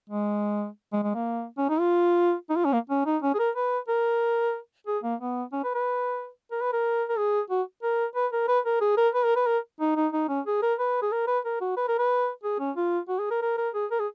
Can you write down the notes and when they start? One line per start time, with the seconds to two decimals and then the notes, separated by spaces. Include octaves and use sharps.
0.10 G#3
0.93 G#3
1.03 G#3
1.15 A#3
1.57 C#4
1.69 D#4
1.80 F4
2.50 D#4
2.56 F4
2.65 C#4
2.73 A#3
2.90 C#4
3.06 D#4
3.22 C#4
3.34 G#4
3.39 A#4
3.56 B4
3.88 A#4
4.87 G#4
5.03 A#3
5.20 B3
5.52 C#4
5.64 B4
5.75 B4
6.52 A#4
6.62 B4
6.73 A#4
7.09 A#4
7.18 G#4
7.50 F#4
7.83 A#4
8.15 B4
8.33 A#4
8.48 B4
8.65 A#4
8.81 G#4
8.97 A#4
9.14 B4
9.25 A#4
9.36 B4
9.47 A#4
9.80 D#4
9.96 D#4
10.13 D#4
10.29 C#4
10.46 G#4
10.62 A#4
10.79 B4
11.02 G#4
11.12 A#4
11.27 B4
11.45 A#4
11.61 F#4
11.77 B4
11.88 A#4
11.99 B4
12.44 G#4
12.59 C#4
12.76 F4
13.08 F#4
13.19 G#4
13.31 A#4
13.42 A#4
13.58 A#4
13.74 G#4
13.91 A#4
13.99 G#4